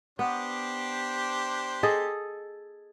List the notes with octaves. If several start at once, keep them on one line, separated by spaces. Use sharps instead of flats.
B3 D4 G4 C5
G#4 A4 D#5